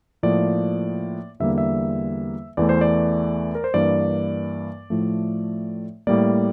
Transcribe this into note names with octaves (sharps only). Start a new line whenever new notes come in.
A2 F3 A#3 D5
E2 D3 G3 A#3 E5
E5
E2 E3 A3 D5
C5
D5
A#4
C5
G2 E3 A#3 D5
A2 F3 A3
A2 G3 A#3 D5